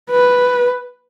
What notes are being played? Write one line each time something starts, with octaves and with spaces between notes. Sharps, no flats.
B4